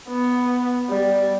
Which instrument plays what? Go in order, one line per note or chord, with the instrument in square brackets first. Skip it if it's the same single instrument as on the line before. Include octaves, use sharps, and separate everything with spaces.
[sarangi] B3
G3